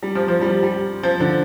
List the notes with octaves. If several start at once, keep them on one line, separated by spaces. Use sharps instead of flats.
G3
F3
F3
G3
G3
F3
D3